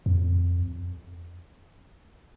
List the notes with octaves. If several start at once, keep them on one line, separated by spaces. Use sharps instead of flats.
F2